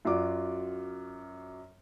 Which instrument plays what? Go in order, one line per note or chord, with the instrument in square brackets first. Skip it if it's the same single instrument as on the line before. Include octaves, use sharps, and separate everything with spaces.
[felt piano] F#2 F4 F#4 D5 D6